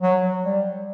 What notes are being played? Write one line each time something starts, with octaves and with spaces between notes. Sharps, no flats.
F#3
G3